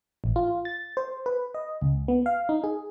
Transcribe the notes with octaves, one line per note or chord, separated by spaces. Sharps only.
A1
F4
A6
C5
B4
D#5
C#2
B3
F5
D#4
G#4